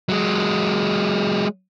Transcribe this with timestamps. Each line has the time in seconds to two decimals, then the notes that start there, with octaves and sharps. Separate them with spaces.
0.09 F#3 G#3